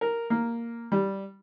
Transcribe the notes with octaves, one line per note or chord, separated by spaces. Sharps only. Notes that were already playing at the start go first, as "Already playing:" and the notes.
A#4
A#3
G3